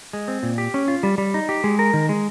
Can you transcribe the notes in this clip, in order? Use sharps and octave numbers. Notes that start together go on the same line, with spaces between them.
G#3
C4
A#2
G4
C#4
F4
G3
G3
D#4
G4
G#3
A#4
D#3
G#3